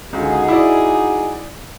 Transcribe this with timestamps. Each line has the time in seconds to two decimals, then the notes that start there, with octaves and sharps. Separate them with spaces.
0.13 C#2 D3 D#4 F#4 G#4
0.48 E4 D5